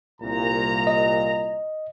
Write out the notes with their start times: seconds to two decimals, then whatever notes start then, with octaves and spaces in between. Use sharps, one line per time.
0.22 C2 A#2 A#5
0.87 D#5